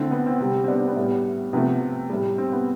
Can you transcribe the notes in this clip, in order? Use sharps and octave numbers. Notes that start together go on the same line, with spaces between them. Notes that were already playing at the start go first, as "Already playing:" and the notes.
Already playing: D3 A3 C4 E4
B3
C4
C3 G3
C4
B3 D4
C4
B3
A2 G3
C3 F3 A3 B3
A2 G3
C4
B3